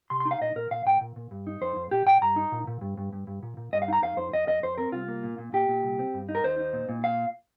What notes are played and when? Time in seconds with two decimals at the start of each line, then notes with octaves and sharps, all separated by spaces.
0.10 C3 C6
0.20 C6
0.25 D#4
0.31 F5
0.41 A#2 D#5
0.56 A#2 A#4
0.71 A#2 F5
0.85 A#2 G5
1.01 A#2
1.16 A#2
1.31 G2
1.47 D#4
1.62 F2 C5
1.76 F2
1.91 A#2 G4
2.06 A#2 G5
2.22 G2 A#5
2.36 D#4
2.52 A#2
2.67 A#2
2.81 G2
2.97 G2
3.13 G2
3.27 G2
3.43 A#2
3.57 A#2
3.73 G2 D#5
3.82 F5
3.88 D#4 A#5
4.02 F2 F5
4.17 F2 C5
4.33 F2 D#5
4.47 F2 D#5
4.63 F2 C5
4.78 C4 A#4
4.92 C2 F4
5.08 A#3
5.23 A#2
5.38 A#2
5.53 A#2 G4
5.69 A#2
5.83 C2
5.99 C4
6.14 G2
6.29 D#4
6.35 A#4
6.44 D#2 C5
6.59 D#4
6.73 A#2
6.89 A#2
7.04 F5